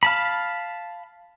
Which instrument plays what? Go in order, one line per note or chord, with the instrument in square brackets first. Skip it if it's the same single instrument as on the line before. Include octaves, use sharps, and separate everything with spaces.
[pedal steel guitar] F5 A5 B5